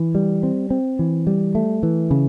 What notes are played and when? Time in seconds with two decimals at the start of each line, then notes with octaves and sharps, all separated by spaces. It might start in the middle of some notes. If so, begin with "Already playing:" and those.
Already playing: E3
0.15 G3
0.43 C4
0.70 C4
0.99 E3
1.27 G3
1.55 A3
1.83 E3
2.11 C#3